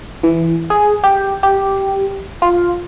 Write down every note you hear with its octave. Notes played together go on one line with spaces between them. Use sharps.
E3
G#4
G4
G4
F4